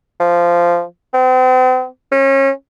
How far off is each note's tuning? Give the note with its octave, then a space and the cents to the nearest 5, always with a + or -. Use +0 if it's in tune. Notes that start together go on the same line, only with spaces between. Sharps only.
F3 -10
C4 -40
C#4 -30